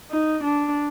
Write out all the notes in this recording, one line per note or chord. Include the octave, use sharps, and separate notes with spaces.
D#4
D4